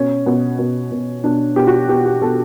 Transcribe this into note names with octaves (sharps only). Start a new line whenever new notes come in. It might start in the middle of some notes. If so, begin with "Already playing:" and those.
Already playing: B2 C#4
B2
B2
B2
B2 D4
B2 G4
F#4
B2 G4
G4
B2 A4